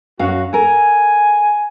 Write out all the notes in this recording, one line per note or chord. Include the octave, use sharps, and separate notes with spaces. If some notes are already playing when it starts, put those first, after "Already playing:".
F#2 F#4 F5
A4 A#4 G#5